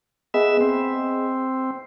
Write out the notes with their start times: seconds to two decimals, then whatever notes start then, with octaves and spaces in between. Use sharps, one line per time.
0.34 B3 G#4 D#5 E5
0.61 C4